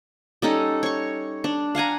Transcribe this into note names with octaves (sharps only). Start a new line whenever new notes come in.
G3 C#4 D#4 A4
C#5 C#6
D4
F5 F#5 G#5 A#5